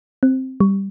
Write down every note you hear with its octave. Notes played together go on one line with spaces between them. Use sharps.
C4
G3